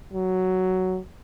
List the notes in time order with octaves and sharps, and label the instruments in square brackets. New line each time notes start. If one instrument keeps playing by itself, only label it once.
[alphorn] F#3